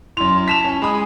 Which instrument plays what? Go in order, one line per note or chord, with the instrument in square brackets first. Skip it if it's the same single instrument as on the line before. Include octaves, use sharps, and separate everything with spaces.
[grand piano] F#2 F7 [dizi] E4 [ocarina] C6
[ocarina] A5 [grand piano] B6 E7 F7
[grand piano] C#4
[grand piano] G#3 D#6 [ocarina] G#5 [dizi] B5